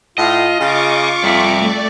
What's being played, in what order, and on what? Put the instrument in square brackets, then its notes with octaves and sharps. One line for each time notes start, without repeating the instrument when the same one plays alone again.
[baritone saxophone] A2 [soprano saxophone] F4 [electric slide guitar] D#5
[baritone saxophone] C#3 [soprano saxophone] F4 [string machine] C#6 D6
[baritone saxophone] F2 [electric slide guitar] G3 E5
[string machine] A3 D5